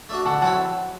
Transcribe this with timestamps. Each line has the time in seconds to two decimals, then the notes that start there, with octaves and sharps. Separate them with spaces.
0.09 A3 D4 F#4
0.25 D3 F#5 A5
0.41 F#3 C4 E4 F#5 A5